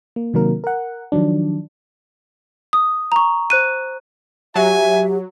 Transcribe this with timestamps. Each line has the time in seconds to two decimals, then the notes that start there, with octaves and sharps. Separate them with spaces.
0.16 A#3
0.34 C3 D#3 F#3 A#3 A#4
0.64 A#4 F#5
1.12 D#3 F3 F#3 D4
2.73 D#6
3.12 A#5 C#6
3.50 C5 F#6 D#7
4.55 F#3 G4 E5 G#5